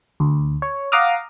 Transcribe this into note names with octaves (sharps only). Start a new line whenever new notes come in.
D2
C#5
F5 F#5 A#5 D6 D#6 F6